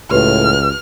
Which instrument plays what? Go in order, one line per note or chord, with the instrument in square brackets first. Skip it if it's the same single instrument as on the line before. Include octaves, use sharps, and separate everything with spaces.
[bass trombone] C#2 [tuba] A2 [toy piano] F#4 G4 B4 [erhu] F6